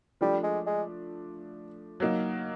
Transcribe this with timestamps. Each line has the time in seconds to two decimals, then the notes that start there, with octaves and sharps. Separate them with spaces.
0.21 F3 G3 A3 D4
0.44 G#3
0.67 G#3
2.00 F#3 A#3 D#4